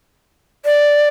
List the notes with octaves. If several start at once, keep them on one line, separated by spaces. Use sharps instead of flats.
D5